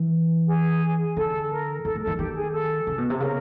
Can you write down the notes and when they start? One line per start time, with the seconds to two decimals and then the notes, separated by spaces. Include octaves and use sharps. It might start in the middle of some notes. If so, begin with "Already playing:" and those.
Already playing: E3
0.47 G#4
1.16 D3 A4
1.51 A#4
1.84 D#3 A4
1.96 A2
2.01 A4
2.07 D#3
2.19 D#3 G4
2.36 G#4
2.53 A4
2.87 C#3
2.98 B2
3.10 C3
3.20 C#3 A#4